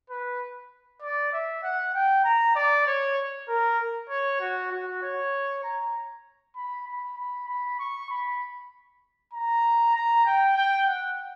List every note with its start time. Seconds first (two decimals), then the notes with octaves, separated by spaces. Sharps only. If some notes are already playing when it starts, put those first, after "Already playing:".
0.10 B4
1.02 D5
1.33 E5
1.63 F#5
1.95 G5
2.25 A#5
2.56 D5
2.87 C#5
3.48 A#4
4.09 C#5
4.41 F#4
4.72 F#4
5.02 C#5
5.63 A#5
6.56 B5
6.87 B5
7.18 B5
7.48 B5
7.79 C#6
8.10 B5
9.33 A#5
9.95 A#5
10.26 G5
10.56 G5
10.87 F#5